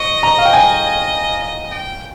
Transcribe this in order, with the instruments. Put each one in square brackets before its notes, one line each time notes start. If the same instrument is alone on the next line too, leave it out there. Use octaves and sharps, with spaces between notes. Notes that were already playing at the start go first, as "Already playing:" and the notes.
Already playing: [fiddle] D#5 [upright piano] C#6
[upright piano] A#5
F5
G5
G#5
[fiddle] D#5
G5